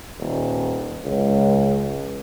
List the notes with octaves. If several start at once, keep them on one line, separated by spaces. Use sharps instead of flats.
D#1
C#2